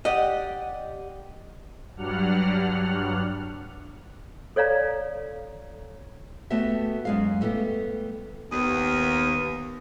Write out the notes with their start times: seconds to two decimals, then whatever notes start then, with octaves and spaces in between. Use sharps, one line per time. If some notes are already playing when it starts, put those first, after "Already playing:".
0.05 G4 D5 D#5 F#5
1.97 G2 F#3 G3 D4 F#5 F6
4.56 A4 C#5 D5 F5 A#5
6.50 A3 B3 F#4 G4 E5
7.05 F#2 G#3 F5
7.41 G3 A3 B3 F#4 G4
8.52 D#2 B3 D#6